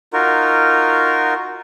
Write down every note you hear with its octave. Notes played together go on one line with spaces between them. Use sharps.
D#4 F4 F#4 A#4